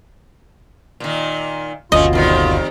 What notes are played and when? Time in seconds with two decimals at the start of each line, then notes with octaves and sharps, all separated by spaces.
1.00 A#2 D#3
1.92 F#1 D2 B2 A3 C#4 F4 D#5
2.13 F2 D#3 G3